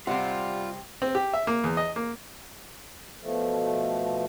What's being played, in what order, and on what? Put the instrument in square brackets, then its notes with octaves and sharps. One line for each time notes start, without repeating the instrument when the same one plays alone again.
[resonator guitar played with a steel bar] C3 C4 [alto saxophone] G3 [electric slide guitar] F4 F5 [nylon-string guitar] F#5
[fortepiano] C4
G4
E5
A#3
E2
D#5
A#3
[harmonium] B2 F3 A3